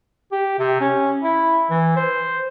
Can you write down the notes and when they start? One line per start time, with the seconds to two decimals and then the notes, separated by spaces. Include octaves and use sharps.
0.32 G4
0.59 C3
0.81 C#4
1.23 E4
1.70 E3
1.96 C5